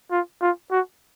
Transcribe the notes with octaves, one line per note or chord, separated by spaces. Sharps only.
F4
F4
F#4